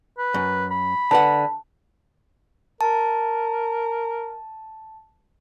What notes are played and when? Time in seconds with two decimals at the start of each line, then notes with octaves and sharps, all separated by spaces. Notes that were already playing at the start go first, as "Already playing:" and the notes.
0.18 B4
0.34 F#2
0.71 B5
1.11 D3 B4 F#5 A5
2.81 A#4 A5